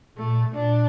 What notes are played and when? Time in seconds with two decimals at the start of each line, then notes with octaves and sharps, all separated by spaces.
0.18 A#2 A3
0.54 A#2 D4